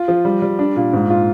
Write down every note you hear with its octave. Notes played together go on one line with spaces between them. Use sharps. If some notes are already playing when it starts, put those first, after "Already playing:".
Already playing: F4
F3
G3
G3
D4
A#2
G#2
F4